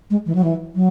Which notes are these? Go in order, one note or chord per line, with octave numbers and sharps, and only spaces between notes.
G#3
E3
F#3
E3
F#3